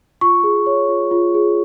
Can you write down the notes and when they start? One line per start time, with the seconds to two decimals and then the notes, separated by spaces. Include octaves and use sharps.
0.21 F4 C#6
0.44 G#4
0.66 C#5
0.89 F4
1.11 F4
1.35 G#4